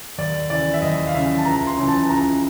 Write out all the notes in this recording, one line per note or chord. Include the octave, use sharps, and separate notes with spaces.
D#2 D5
C#3 E3 D5
E5
D#2 D#5
F5
C#3 E3 E5
A5
C#2 A#5
C6
C#3 E3
A5
C#2 A#5